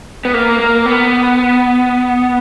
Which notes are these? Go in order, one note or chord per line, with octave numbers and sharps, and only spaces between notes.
B3
A#3
A#3
B3